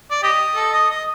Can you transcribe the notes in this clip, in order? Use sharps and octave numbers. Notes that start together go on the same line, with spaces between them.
D5
G4 D#5
A4
D#5
D#5